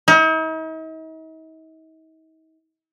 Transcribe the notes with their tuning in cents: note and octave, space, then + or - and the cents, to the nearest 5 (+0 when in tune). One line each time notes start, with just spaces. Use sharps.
D#4 +45